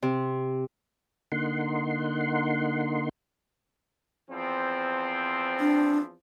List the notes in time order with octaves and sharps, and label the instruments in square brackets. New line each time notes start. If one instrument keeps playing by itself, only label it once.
[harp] C3
[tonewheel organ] D3 A#3 D#4 F#5 C6
[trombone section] E2 F3 C4
[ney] D4